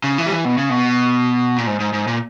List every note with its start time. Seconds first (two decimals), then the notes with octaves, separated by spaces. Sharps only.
0.04 C#3
0.18 E3
0.26 G3
0.32 E3
0.45 B2
0.58 C#3
0.70 B2
1.58 A#2
1.67 G#2
1.80 G#2
1.93 G#2
2.08 A#2